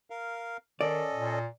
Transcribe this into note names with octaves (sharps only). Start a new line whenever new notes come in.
A#4 F5
D#3 C#4 A4 D5 D#5
A#2